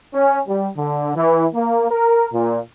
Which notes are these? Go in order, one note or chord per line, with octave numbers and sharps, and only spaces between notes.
C#4
G3
D3
E3
A#3
A#4
A#2